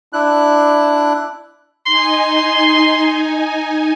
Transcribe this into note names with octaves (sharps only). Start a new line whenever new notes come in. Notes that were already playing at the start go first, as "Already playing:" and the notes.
D4 E4 F#6
D#4 G#5 C6